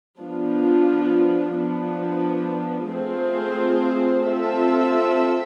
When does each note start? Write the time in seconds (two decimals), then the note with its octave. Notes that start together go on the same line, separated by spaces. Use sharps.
0.19 F3 B3 D4 F4
1.55 F3 B3 D4
2.91 A3 C4 F4 G#4 C5
4.28 C4 F4 A4 E5